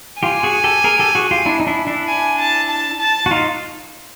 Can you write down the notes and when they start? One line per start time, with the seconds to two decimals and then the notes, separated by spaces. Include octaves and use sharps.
0.23 F4 G4 G#5
0.43 F#4 G#4
0.64 G4 A4
0.84 G#4 A#4
0.99 G4 A4
1.15 F#4 G#4
1.31 F4 G4
1.46 D4 E4
1.60 D#4
1.67 D4 E4
1.87 D4 E4
2.08 G#5
2.39 A5
2.70 A5
3.00 A5
3.26 F#4
3.31 D#4 F4